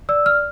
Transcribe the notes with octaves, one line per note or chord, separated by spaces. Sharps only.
D5 E6
F6